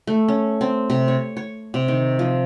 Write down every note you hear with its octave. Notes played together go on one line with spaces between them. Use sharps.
A3
C#4
C4
C3
C#5
C#5
C3
D#3
F3